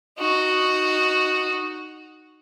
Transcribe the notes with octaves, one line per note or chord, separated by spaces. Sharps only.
D#4 F#4